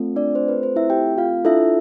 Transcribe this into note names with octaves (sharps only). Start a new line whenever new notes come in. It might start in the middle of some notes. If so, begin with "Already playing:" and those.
Already playing: A3 C4 F4 A4
D4 D5
C5
B4
C5
E4 E5
G4 G5
F4 F5
D4 E4 F4 A4 E5